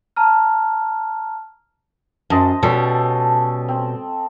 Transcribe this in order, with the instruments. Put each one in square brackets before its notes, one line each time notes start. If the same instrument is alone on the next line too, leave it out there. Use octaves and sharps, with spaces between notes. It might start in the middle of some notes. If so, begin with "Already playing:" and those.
[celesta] A5 A#5 F6
[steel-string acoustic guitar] F#2 [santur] C5 D#5 A5
[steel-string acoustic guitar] B2 G3 [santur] C#4 A4 D#5
[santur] C4